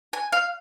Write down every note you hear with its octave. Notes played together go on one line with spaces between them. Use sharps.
G#5
F5